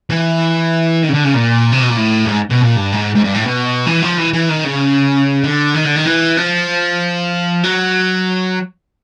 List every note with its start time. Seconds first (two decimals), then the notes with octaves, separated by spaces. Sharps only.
0.10 E3
1.03 D#3
1.09 C#3
1.14 D3
1.25 C#3
1.35 A#2
1.72 C3
1.81 B2
1.90 A#2
1.97 A2
2.25 G2
2.29 G#2
2.50 B2
2.61 A#2
2.76 G2
2.92 G#2
3.15 G#2
3.24 G2
3.34 A2
3.45 B2
3.86 E3
4.02 F3
4.17 E3
4.33 E3
4.49 D#3
4.64 C#3
5.44 D3
5.74 D#3
5.85 D3
5.96 D#3
6.06 E3
6.37 F3
7.64 F#3